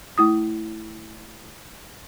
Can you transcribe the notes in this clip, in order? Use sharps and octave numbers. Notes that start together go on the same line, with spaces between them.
A3 E4 D#6